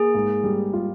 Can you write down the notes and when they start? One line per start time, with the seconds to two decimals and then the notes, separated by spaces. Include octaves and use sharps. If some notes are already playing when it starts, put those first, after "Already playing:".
Already playing: A#3 G#4
0.15 G#2
0.44 G3
0.74 F4